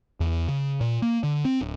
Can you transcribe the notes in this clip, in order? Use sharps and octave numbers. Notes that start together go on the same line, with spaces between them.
E2
C#3
A#2
A#3
D3
C4
D1